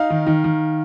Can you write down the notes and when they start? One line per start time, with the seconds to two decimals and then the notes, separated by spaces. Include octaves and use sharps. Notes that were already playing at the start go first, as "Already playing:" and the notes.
Already playing: D#4 F5
0.10 D#3
0.27 D#3
0.44 D#3